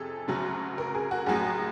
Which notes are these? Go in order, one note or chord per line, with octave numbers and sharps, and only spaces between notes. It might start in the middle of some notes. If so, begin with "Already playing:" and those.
Already playing: F2 C3 G#4 A4
D2 C#3 F#3
A#4
G#4
F#4
A1 A2 F#3 G#4